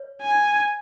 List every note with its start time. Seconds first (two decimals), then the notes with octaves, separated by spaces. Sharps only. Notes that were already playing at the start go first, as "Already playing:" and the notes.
Already playing: C#5
0.22 G#5